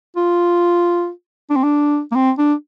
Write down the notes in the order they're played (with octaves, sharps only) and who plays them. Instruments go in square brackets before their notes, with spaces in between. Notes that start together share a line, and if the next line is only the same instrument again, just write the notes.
[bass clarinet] F4
D4
C4
D4
A#3
C4
D4